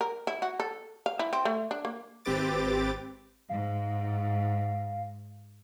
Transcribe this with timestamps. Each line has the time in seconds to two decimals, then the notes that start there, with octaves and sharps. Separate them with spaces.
0.01 A#4
0.27 E4
0.42 F#4
0.60 A4
1.06 F5
1.19 E4
1.33 C4
1.45 A3
1.71 D4
1.85 A#3
2.25 G#1 C4 G4 B4 D6 A6
3.49 G#2 F5